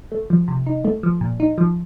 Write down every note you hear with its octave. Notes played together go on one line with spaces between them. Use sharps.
A3
F3
C3
D#4
A3
F3
A#2
D#4
F3